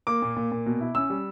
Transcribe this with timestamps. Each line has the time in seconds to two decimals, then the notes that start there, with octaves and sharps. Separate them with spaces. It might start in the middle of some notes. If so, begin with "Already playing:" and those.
0.07 A#3 D6
0.22 A#2
0.36 A#2
0.52 A#2
0.66 B2
0.81 E4
0.95 C#4 E6
1.10 G3